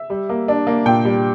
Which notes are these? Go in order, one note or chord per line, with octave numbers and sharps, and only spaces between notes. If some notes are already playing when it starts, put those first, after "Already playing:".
Already playing: E5
G3
A#3
D4
A#3
A#2 G5
G3